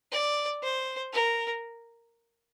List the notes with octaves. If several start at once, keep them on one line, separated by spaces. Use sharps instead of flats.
D5
C5
A#4